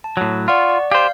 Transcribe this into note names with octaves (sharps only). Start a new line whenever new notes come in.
A5
A2 F#3
F4 D5 F#5 C#6
D5
G4 C5 F5 G6 C7